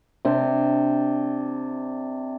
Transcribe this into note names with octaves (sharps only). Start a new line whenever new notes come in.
C3 D4 C5